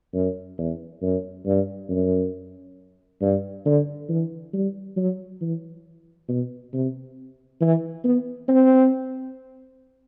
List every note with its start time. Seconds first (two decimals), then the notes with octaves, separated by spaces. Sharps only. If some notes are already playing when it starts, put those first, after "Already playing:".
0.14 F#2
0.58 E2
1.02 F#2
1.46 G2
1.89 F#2
3.21 G2
3.65 D3
4.09 E3
4.53 G3
4.97 F#3
5.41 E3
6.29 B2
6.73 C3
7.61 E3
8.04 B3
8.48 C4